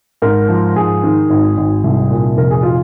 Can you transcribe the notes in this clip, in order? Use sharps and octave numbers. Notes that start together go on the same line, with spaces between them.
G#2 A#4
F3
G#2 G#4
D#3
G#1
G#1
C2
A#2
F1 A#4
G#4
F4